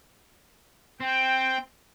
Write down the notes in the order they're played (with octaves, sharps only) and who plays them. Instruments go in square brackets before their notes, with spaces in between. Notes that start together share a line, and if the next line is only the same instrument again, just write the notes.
[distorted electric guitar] C4 [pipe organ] G5